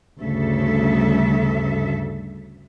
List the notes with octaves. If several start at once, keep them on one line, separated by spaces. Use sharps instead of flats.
D2 G2 C#3 A4 E5